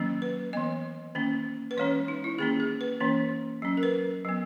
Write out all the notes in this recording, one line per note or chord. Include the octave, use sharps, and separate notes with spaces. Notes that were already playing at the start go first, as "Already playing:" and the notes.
Already playing: D#3 F#3 A#3 C#4
B4
E3 B3 D#5
D#3 A#3 C#4
B4
E3 G#3 C#4 C#5
D#4
E4
D#3 A#3 C#4 G#4
G#4
B4
E3 A#3 C#4
F#3 C#4
A#4
B4
F#3 B3